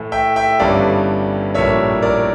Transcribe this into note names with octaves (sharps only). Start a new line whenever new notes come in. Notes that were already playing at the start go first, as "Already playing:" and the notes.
Already playing: A2 E3 A3
E5 G5
E5 G5
G1 G2 E3 G3 C#4 D5 F5
A#1 A2 G3 A#3 D4 C#5 E5
A#4 D5